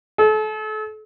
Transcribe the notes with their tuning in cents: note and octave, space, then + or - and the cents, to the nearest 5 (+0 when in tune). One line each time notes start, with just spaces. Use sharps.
A4 -35